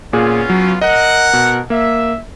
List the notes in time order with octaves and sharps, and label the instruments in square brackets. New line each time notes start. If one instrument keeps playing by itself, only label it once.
[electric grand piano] A#2 G#4 [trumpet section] B3 C#4 F4
[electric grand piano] F#3
[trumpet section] A#4 F#5 [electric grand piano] D#5
[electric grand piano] B2
[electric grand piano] A#3 [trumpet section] E5